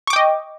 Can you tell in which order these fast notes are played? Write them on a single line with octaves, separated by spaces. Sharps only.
C#6 D6 G5 D#5